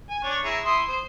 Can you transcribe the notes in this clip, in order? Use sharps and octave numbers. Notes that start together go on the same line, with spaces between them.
G#5
D4 C#5 C#6
E4 G#4 A#5
E4 C6 D#6
C5